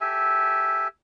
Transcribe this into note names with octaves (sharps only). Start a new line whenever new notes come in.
G4 A4 E5 G#5